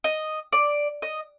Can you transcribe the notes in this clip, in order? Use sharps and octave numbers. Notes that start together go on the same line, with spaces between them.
D#5
D5
D#5